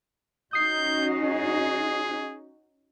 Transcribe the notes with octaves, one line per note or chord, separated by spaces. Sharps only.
C#4 D#4 F#4 D#6 G6 C7
G#4